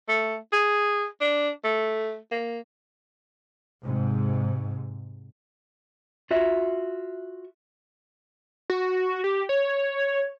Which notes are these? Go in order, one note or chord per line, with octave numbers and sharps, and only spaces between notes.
A3
G#4
D4
A3
A#3
G#2 C3
F4 F#4 E5
F#4
G4
C#5